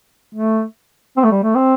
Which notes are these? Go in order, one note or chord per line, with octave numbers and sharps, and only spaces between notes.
A3
C4
A3
G3
A3
C4